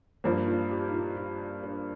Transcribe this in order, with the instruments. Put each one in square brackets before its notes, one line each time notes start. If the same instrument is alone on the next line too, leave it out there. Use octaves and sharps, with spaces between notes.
[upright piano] G2 F3 A#3 [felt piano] D4
[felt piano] D#4
F4
G4
D#4
F4
F4
D4